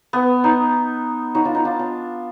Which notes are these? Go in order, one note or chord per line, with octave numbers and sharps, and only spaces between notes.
B3
D#4
D#4 F#4
D4 F4
D#4
D4 F4
D4